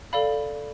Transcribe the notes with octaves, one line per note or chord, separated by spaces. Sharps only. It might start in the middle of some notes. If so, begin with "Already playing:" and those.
A4 D5 F5 B5